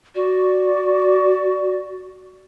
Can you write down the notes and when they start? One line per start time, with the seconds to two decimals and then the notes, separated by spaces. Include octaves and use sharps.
0.15 F#4 D5